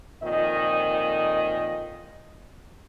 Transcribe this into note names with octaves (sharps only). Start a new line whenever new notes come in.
F2 A#2 D#3 D#5